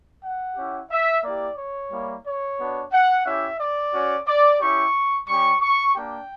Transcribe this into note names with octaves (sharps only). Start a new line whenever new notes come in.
F#5
C#4 E4 G4
E5
A#3 E4 G4 D5
C#5
G3 A#3 E4
C#5
B3 D4 F#4
F#5
C#4 E4 G4 E5
D5
C#4 F#4
D5
C#4 E4 G4 C#6
G3 C#4 G4 C#6
C#6
A#3 D4 G4 G5